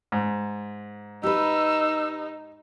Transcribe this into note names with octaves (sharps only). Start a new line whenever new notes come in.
G#2
D#4 G4 B4 E6